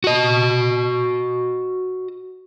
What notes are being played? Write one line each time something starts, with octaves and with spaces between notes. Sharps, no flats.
F#4 D#5